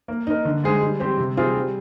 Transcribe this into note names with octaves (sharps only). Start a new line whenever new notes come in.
A#3
D#4 A#4
D3
G#3 D#4 G#4 C5
G3
C4 G4 C5
C3
G3 C4 F4 G#4
G3